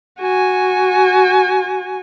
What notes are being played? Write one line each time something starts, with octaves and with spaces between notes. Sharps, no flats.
F#4 G#5